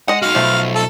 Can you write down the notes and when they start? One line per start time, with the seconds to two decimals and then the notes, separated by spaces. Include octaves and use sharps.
0.08 G#3 D#5 F#5
0.22 D#4 F#4 F5
0.35 B1 F3 A3
0.75 A4